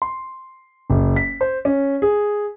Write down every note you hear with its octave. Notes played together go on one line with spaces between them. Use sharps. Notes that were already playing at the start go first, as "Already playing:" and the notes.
C6
F#1
B6
C5
C#4
G#4